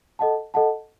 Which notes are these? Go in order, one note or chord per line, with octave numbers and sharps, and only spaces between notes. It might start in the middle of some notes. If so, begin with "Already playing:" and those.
A4 D#5 F#5 A5
A4 D#5 F#5 A5